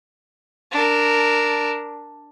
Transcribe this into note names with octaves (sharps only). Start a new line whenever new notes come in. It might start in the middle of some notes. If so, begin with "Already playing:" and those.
D4 A#4